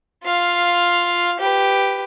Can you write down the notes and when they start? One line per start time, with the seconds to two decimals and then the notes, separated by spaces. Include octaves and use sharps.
0.24 F4 F5
1.39 G4 B4